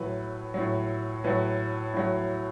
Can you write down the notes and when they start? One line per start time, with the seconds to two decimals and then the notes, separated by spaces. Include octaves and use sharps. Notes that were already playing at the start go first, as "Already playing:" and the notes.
Already playing: A2 F#3 B4
0.54 A2 F#3
1.24 A2 F#3 B4
1.94 A2 F#3